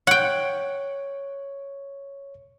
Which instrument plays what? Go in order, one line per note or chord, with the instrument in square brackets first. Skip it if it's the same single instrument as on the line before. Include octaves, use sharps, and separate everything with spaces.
[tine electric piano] C#5 [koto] F#5 G5